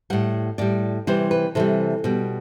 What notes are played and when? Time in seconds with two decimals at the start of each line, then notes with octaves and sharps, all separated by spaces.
0.10 A2 G3 F#5
0.58 A2 G3 D5
1.07 C3 E3 G3 C5
1.31 B4
1.55 C3 E3 G3 A4
2.04 B2 G3